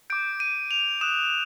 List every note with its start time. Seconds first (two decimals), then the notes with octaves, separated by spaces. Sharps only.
0.10 D6 G6 D7
0.40 D#7
0.71 F7
1.01 D#6 F#6 E7